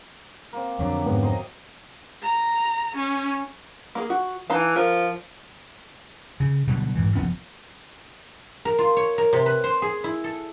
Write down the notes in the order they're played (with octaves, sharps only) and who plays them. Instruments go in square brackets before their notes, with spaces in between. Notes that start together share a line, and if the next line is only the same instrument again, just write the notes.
[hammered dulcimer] A#3 C4
[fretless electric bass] F2 D3 [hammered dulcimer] F#3 G4
[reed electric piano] G#2 B3
[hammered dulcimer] C5 D#5 A#5
[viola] A#5
C#4
[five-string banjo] A#3 G#4
F#4
[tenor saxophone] E3 [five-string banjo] D#4 F5 A5
[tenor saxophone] F3 [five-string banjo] A#4
[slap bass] C#3
B2 D3 F#3 G3
G#2 E3
F#1 F3 B3 C#4
[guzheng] A#4
F4
C#5
A#4
C3
B4
C5
G#4
E4
A4